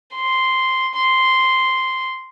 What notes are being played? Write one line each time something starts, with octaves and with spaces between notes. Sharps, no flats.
C6
C6